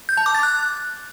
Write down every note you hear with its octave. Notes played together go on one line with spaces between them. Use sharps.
G6
A5
D6
A6
F#6